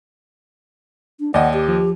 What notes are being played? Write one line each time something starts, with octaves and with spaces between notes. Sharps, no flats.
D4
D#2 D5 D#5 F#5
G4
F3